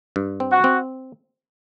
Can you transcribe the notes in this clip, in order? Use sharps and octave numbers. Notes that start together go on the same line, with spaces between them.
G2
C4
F#4
C4